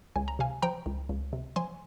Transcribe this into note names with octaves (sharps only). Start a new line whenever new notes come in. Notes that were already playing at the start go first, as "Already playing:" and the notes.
C#2 G#5
A#5
C3 F5 G#5
F3 G5 A#5
C#2
C#2
C3
F3 G#5 C6